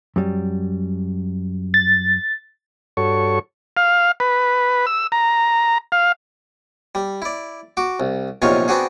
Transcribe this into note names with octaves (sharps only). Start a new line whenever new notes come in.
F#2 G3
A6
G2 F#4 A4 C#5 C#6
F5
B4
E6
A#5
F5
G3
E4 D5
F#4 D6
C2
A#1 E2 C3 D#4 F4 C#5
B3 C4 D4 F#4 G#4